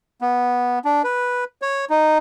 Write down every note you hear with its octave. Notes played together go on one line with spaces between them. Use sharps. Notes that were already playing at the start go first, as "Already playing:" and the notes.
B3
D4
B4
C#5
D#4